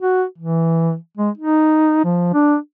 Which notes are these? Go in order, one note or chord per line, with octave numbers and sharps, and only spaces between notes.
F#4
E3
G#3
D#4
F3
D4